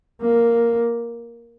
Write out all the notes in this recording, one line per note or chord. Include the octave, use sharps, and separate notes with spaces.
A#3